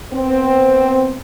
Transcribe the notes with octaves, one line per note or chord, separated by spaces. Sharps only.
B3 C4